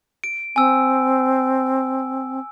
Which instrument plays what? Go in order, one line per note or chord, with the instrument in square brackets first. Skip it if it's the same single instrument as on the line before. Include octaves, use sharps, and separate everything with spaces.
[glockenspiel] D7
[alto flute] C4 [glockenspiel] G#5 E6